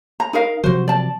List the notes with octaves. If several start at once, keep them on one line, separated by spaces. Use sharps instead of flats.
A#5
D#4 A#4 F5
C3 F3 F#3 F#4 C5
D5 A5